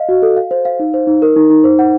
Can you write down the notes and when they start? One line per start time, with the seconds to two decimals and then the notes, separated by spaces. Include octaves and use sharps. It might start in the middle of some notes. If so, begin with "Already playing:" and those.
Already playing: D#5 F5
0.09 F#4
0.22 A4
0.36 F5
0.51 C5
0.65 F5
0.79 D#4
0.94 C5
1.07 D#4
1.22 A#4
1.36 D#4
1.50 D#4
1.64 C5
1.79 F#5